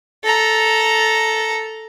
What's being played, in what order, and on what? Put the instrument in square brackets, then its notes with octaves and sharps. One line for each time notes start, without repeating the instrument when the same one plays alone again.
[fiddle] A4 A#5